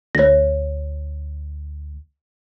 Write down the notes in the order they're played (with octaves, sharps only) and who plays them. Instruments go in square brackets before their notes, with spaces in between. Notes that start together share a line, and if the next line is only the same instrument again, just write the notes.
[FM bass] D2 [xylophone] C#5 A#6